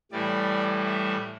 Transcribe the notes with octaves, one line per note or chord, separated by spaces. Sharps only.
A2 E3 G3 D5
E5